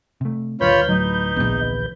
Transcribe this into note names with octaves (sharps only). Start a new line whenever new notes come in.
C3 A3
D#1 D2 G2 F4 B4 C#5 B5 G6
A2 F#3 D#4
A#1 E3 B3